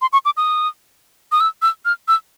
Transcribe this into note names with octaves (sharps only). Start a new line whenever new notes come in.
C6
C#6
D6
D#6
D#6
E6
E6
F6
E6